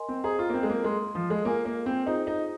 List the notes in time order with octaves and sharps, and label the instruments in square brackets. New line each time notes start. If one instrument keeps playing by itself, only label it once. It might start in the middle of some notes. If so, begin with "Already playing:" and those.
Already playing: [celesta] A#4 D#5 G#5 C6
[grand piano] C4
[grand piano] G#4 [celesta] C5 D#5 A#5
[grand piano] F4
A#3
C4
G#3
A#3
[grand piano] G#3 [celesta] A#4 D#5 C6
[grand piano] F3
G#3
[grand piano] A#3 [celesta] F4 G#4 F5 G#5
[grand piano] A#3
C4
[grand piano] D#4 [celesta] F4 G#4 C5 D#5
[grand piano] D#4